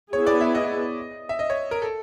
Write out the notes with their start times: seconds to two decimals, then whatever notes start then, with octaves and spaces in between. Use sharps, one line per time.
0.12 B3 E4 G#4 C#5
0.26 D5
0.41 E5
0.55 D#5
1.29 E5
1.39 D#5
1.50 C#5
1.71 A#4
1.82 A4